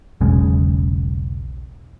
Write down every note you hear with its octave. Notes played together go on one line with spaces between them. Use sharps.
E1 B1 C#3 G#3